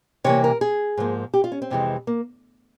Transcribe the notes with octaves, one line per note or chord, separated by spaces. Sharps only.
C3 E3 G3 A#3 C#5
A#4
G#4
G#2 F3 A#3
G4
F4
C#4
C4
F2 C3 E3 G#3
A#3